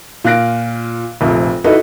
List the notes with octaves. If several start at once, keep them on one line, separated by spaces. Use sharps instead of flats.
A#2 F5 F#6 A#6 D7
F1 A#1 F2
D#4 E4 F#4 A4 B4 D#5